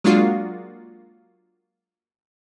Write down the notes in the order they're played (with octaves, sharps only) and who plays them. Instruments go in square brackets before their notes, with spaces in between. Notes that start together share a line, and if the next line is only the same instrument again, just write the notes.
[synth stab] F#3 G#3 A#3 D4 F4 F#4